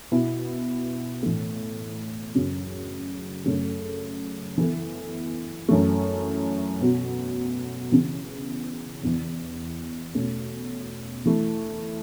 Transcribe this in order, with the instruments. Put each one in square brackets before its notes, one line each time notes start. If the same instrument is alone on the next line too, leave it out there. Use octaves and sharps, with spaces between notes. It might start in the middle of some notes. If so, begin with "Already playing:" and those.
[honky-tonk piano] B2 B3 E4
A2 E3 A3
F#2 C#3 F#3
F#2 C#3 A3 C#4 A4
E3 B3 E4 A4
F#2 E3 A3
B2 B3 F#4
C#3 E3 B3
E2 E3 B3
B2 A3 C#4
E3 A3 E4